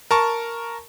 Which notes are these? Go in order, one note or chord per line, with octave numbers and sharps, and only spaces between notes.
A#4 A5 C#6